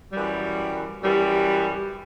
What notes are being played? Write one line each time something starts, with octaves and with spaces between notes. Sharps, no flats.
F#2 E3 G3
F#2 E3 G3